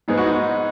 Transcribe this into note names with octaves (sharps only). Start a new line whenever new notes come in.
G#2 G#3 B3 D#4
F#4
D#4